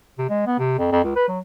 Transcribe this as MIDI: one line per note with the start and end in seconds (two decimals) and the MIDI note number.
0.18 0.26 48
0.29 0.43 56
0.47 0.59 59
0.59 0.76 48
0.78 0.88 41
0.92 1.01 41
1.04 1.13 37
1.16 1.25 71
1.28 1.39 54